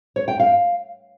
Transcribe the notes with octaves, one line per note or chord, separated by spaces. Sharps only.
C#5
G5
F5